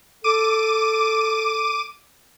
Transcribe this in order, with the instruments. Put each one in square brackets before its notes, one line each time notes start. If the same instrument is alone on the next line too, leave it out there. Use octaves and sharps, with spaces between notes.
[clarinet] A4 [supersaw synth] D6 D#7